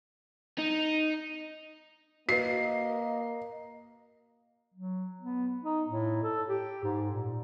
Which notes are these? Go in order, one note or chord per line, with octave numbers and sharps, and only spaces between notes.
D#4
A#3 F#4 B4 D#5 C7
F#3
B3
D#4
A2
A4
G4
G#2
A#2